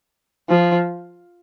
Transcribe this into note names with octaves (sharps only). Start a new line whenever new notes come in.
F3